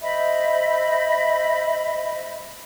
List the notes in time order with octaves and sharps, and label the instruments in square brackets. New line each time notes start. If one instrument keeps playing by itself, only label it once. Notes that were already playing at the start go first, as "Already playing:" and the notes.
[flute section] C5 D#5 E5 B5